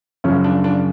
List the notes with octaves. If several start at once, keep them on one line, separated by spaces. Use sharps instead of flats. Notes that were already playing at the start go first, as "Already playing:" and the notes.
F#2 C#3 F3 C#4
D4
D4